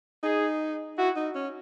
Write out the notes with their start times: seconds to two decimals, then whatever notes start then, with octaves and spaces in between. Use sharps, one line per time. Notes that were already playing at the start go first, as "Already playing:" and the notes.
0.23 D#4 G#4
0.98 E4 F#4
1.16 D#4
1.35 C#4